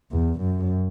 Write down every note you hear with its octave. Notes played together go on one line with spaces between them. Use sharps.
E2
F#2